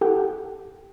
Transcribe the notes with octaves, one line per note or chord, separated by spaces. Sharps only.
E4 G4 A4 F#5 G5